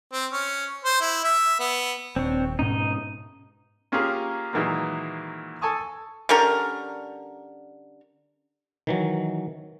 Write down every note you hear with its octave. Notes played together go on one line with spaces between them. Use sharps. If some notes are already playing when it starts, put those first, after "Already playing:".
C4
C#4
C5
E4
E5
B3
D#1 C4 D4 C#5
G#2 B2 C#4 D#4 D#5
A#3 C#4 F4 G4 G#4 A#4
A#2 D#3 E3 F#3 G#3 A#3
A4 G#5 A5 C#6 D#6
D3 G3 C#4 A#4
D#3 E3 F#3